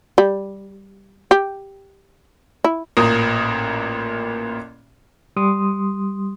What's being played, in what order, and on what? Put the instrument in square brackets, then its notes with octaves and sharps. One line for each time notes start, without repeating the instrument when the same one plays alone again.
[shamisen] G3
G4
E4
[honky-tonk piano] A1 A#2 A#4 D#6
[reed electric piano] G3 C6 D#6